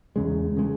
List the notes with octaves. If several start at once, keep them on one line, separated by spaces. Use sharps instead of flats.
E2 C#3 G#3
C#3 G#3